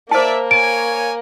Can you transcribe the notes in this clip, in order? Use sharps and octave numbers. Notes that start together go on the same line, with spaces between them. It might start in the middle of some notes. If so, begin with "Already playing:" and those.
A#3 C5 D5 E5 A5
C#5 G#5 D7